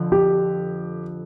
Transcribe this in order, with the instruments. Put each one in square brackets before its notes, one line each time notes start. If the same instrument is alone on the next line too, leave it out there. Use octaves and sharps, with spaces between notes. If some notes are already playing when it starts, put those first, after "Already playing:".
Already playing: [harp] F2 D3 F3
[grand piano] G4